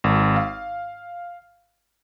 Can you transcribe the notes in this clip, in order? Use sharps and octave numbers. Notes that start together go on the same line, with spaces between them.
G#1
F5